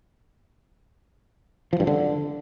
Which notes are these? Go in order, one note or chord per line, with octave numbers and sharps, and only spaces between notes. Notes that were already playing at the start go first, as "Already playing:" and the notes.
F3
G2
D3